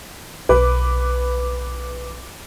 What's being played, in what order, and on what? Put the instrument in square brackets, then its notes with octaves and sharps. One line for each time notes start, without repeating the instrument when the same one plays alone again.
[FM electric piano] B1 D6 [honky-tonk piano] B4